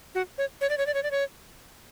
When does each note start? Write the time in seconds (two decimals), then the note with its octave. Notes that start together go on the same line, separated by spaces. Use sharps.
0.15 F#4
0.38 C#5
0.61 C#5
0.70 D5
0.78 C#5
0.86 D5
0.94 C#5
1.03 D5
1.11 C#5